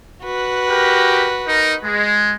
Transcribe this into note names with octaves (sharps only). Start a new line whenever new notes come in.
F#4 B4
G4 A#4
D#4 A#4
G#3